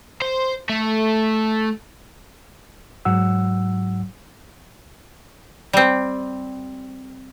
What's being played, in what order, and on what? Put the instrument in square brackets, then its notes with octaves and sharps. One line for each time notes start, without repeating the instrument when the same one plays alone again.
[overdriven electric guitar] C5
A3
[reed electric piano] G#2 F#3 F#5 E6
[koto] G3 C4